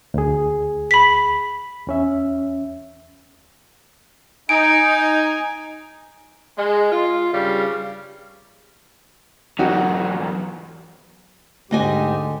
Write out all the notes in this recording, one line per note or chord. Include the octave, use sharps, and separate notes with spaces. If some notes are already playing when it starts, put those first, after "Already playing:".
D2 G#4
B5 B6
E2 C#4 E5
D#4 G#5 D7
G#3
F4
G2 C#3 G3 F5
E2 F#3 D#4 F#4 G4
D2 G#2 G#3 G4 D#5 G#5